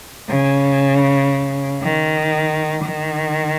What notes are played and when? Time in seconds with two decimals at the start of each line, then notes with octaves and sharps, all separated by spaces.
0.29 C#3
1.82 D#3
2.84 D#3